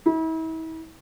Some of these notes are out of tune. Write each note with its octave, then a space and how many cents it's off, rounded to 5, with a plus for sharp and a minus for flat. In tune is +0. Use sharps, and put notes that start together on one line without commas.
E4 -40